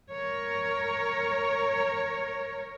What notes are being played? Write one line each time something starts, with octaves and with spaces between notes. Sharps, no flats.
A#4 C#5